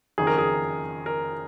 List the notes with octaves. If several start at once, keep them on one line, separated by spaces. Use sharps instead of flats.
F#1 F2 D#3 G#4
A#4
G#4
A#4